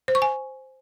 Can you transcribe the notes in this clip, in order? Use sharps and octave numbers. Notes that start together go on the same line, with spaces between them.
C5
C#6
G#5